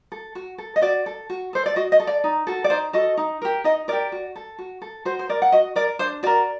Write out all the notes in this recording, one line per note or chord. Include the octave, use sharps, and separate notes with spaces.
A4
F#4
A4
D#5
F#4 D5
A4
F#4
A4 C5
D5
F#4 D#5
D#5
A4
D5
D#4
F#4 A4
D5
D#4 C5
F#4 A4 D#5
D#4
G4 A#4
D#4 D#5
G4 A#4 D5
F#4
A4
F#4
A4
F#4 C5
C5
A#4 D5
F#5
F#4 D#5
A#4 D5
D4 C5
F#4 A#4 D5